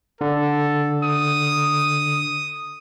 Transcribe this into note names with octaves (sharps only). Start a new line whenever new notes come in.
D3 A4
D#6